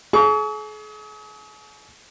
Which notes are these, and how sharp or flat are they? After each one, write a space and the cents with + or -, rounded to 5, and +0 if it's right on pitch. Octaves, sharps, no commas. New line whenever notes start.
G#4 +40 C#6 +40